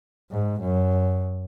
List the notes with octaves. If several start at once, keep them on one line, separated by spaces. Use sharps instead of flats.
G#2
F#2